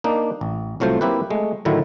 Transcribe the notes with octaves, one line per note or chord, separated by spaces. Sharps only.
A#3 D4 D#4
A1
C2 F#3 A3 F4 C5
A#3 C4 E4 G4 B4
G#3 A3
A2 D3 D#3 F#3 E4 F4